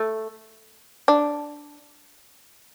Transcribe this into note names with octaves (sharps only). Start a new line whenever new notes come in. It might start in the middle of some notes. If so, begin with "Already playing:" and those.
Already playing: A3
D4